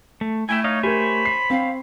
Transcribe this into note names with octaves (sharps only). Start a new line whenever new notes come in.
A3
A3 E4 E5 G5 G#5
D#4 C#5 D#5 F5
G4 A#4 C5 C#5 G#5 B5
C7
C4 F5